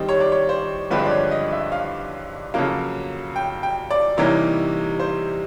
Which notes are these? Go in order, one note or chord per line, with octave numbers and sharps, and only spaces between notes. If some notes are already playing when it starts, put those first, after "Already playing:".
Already playing: D#3 G3 C4 D#5
C#5
D5
C#5
C5
G2 D3 F3 G#3 C4 B4
D5
C#5
D#5
E5
F5
F2 C#3 F#3 A#3 F5
G5
G5
D5
C3 E3 G3 A#3 D#4 C#5
C5